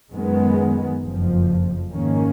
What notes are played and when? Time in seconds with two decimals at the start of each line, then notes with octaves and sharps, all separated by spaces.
0.12 F#2 D#3 G#3 B3
1.01 F#1 F2 F3
1.91 G#2 D#3 A#3 C#4